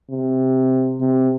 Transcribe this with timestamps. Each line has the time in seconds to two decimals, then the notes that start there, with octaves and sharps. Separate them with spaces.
0.11 C3
1.01 C3